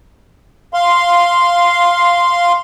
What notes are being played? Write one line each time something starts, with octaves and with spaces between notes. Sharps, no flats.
F5 C6